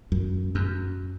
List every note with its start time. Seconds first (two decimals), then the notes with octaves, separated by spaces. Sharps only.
0.12 F#2
0.55 F#2